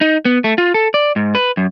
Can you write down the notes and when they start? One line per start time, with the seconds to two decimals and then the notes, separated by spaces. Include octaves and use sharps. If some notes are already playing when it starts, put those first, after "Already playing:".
0.01 D#4
0.25 B3
0.44 A3
0.58 F4
0.74 A4
0.94 D5
1.16 G#2
1.35 B4
1.57 F#2